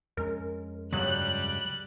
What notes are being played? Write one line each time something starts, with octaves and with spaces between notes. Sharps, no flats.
F2 G#3 C#4 A#4
C#2 G2 F#3 G3 F#6